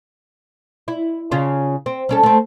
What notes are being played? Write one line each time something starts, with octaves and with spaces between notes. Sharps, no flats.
E4
C#3 C#4 F4
C4
G3 C#4 A4
A3 C4